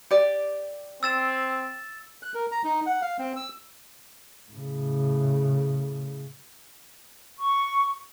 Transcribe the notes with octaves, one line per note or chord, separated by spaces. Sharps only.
G4 D5
C4 E6 A6 E7
F#6
A#4
A#5
D#4
F#5
F5
C4
E6
A2 C#3
C#6